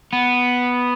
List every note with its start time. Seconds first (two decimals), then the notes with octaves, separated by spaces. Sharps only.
0.13 B3